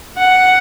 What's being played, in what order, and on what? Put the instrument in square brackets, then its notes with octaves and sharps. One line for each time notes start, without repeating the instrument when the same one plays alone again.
[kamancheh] F#5